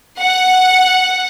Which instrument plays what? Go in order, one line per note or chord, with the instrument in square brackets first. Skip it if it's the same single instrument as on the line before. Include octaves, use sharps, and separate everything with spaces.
[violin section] F#5